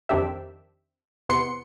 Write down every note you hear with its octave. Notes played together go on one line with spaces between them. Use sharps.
F2 D#3 C4 D4 G4 E5
E2 C3 B3 C6 C#7